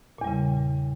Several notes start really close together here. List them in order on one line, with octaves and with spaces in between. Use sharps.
A#2 E2 G3 C#3